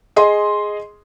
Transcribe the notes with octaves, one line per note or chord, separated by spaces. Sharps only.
G#4 D#5 C6